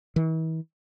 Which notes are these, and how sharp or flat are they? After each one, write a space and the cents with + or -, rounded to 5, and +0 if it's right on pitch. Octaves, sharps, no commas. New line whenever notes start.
E3 -40